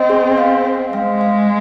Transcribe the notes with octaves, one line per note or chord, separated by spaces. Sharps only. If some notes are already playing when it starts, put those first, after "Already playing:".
Already playing: C4 D#5
G#4
F5
C5
G#3 F5
F5